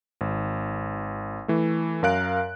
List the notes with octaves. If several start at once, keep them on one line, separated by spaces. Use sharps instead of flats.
G#1
E3 A3
F#2 A#4 F5 F#6 D7